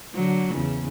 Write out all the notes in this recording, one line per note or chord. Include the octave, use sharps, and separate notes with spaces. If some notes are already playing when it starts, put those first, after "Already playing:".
D3 F#3
E2 C#3